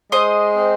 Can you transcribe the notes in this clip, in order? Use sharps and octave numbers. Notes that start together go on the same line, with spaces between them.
G#3 C5 D#5
C4